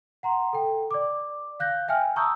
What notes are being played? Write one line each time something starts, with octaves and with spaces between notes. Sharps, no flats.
F#5 A#5 C6
A4 G5
D5 D6
F5 F#6 G6 A#6
E5 G5 G#5 F6
A5 A#5 C#6 D#6 E6 G6